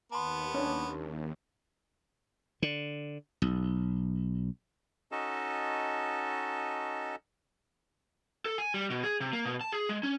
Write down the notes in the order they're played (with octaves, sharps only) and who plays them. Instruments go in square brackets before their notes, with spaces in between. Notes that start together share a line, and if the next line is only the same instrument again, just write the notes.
[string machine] D#2 [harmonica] B3 [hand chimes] A5 C6
[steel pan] C#4 D4
[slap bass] D3
B1
[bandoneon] C#4 D#4 F#4 A4 D#5 A5
[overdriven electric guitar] A4
G#5
G3
B2
G#4
C3
A#3
B2
A5
G#4
G#3
C#4